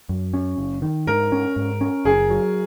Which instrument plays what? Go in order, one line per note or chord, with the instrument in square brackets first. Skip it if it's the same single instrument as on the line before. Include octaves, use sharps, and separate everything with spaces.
[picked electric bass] F#2
C#4
F#1
D#3
[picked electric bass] G#2 [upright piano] A#4
[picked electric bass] C#4
G#2
C#4
[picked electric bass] F#1 [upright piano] G#4
[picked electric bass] F#3